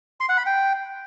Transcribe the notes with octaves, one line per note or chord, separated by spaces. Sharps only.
C6
F#5
B5
G5